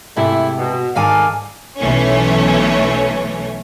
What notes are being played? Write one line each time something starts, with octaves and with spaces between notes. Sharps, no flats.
G#2 C3 A3 E4
B2
G#2 D#3 A4 D5 F5 G#5
B1 E3 A3 C#4 C#5